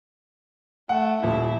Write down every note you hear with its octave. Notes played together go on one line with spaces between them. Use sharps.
A3 F#5
D#1 F3 E4